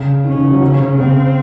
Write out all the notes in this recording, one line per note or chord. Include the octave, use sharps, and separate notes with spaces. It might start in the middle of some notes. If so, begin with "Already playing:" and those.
Already playing: C#3
D#3 C#4
C#3
E3
F#3
C#3
C#3
C#3 C4